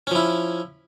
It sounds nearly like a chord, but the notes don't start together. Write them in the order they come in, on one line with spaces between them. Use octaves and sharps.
C#4 F3 E4